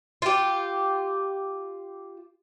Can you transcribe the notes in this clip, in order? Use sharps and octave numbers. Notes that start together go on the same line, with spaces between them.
F4 G4